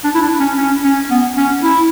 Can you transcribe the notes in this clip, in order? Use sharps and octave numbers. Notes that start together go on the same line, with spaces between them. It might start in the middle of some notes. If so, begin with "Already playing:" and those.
D4
E4
D4
C#4
C#4
C#4
B3
C#4
E4